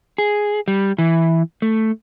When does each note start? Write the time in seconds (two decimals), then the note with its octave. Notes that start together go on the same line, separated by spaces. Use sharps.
0.18 G#4
0.68 G3
0.98 E3
1.62 A3